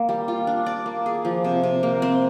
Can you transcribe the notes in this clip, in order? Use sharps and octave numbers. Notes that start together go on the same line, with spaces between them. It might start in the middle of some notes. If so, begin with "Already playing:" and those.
Already playing: A#3
G3
F4
D4
D5
A#3
G#4
F3
C3
C3
A#3
C4